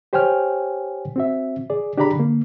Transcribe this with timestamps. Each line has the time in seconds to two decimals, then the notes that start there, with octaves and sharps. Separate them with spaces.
0.13 G4 C5 C#5 G5 G#5 F6
1.16 C4 F#4 E5
1.70 G#4 D5
1.98 D4 G4 G#4 D5 A#5 B5
2.16 D3 A#3